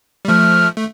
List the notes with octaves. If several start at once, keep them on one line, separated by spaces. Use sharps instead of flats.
G3
F3 A3 F6
A3